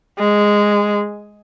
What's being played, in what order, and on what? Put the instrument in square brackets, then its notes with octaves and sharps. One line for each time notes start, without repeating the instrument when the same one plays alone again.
[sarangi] G#3